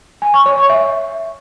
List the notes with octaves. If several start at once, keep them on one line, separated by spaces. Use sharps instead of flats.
G#5
C#6
C#5
C#6
E5